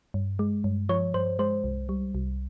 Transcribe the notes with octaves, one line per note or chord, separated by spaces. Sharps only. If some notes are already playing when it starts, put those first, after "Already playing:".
G2
G#3
G2
F3 C#5
G2 C5
G#3 C5
C2
G3
C2